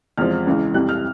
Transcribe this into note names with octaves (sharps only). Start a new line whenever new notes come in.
E2 C3 F3 G#3 F6
C#2 C#3 E3 G#3
F2 C3 E3 G3 F#6
F6